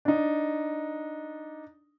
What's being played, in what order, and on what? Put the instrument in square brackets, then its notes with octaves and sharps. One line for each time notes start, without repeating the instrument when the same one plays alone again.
[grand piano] D4 D#4